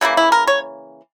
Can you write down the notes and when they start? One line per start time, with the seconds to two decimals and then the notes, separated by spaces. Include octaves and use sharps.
0.01 C#3 E3 A#3 E4
0.17 E4
0.32 A#4
0.47 C#5